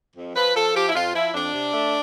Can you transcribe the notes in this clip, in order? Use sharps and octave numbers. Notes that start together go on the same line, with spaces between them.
F2
F3 B4
F3 A4
F3 G4
E4
F2 F4
F3 E4
F2 D4
C3
A3